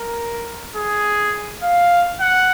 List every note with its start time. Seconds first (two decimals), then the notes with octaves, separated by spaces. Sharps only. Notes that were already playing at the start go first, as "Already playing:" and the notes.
Already playing: A#4
0.76 G#4
1.63 F5
2.21 F#5